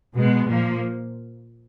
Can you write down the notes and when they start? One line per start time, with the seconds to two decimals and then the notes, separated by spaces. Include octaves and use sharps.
0.15 B2 G#3 B3
0.47 A#2 F3 A#3